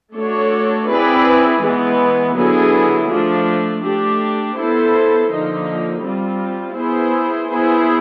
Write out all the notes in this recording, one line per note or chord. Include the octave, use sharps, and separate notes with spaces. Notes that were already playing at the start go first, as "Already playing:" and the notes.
A3 D4 F#4 A4 C#5
C4 E4 G#4 B4 D5
E3 G#3 B3
D3 F#3 B3 E4 G#4
F3 A3 D4
A3 D4 G4
B3 E4 A4 C5
D3 F3 A#3 D#4
G3 C4 F4
B3 E4 G#4 C5
B3 E4 G#4 C5